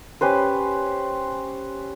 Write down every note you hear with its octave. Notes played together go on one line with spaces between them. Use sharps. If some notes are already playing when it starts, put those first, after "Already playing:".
C#4 G4 B4 C5